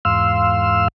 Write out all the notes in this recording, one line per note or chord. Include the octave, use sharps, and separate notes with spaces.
E2 G#2 F5 C6 E6